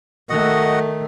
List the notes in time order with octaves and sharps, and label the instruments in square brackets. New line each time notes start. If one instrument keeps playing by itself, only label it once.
[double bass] D#3 A3 [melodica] F#4 D#5 F#5